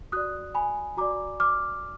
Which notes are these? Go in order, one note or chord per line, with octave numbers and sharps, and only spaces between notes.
F#4 D5 D#6 F#6
G#5 B5
F#4 D5 A#5 D6
D6 F6